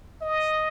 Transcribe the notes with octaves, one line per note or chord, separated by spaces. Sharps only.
D#5